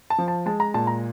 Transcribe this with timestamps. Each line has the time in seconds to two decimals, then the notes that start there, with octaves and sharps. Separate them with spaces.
0.10 A5
0.18 F3
0.28 A5
0.46 G#3 A5
0.60 A#5
0.74 A#2 A5
0.87 A#5